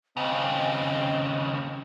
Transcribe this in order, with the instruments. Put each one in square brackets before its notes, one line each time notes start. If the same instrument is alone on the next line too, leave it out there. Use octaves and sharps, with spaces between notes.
[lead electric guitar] D#2 C#3 [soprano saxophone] C4 [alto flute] D#5